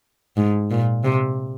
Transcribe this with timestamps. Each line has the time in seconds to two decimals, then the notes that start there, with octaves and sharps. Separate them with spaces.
0.37 G#2
0.71 A#2
1.04 C3